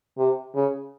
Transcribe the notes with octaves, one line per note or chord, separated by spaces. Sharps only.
C3
C#3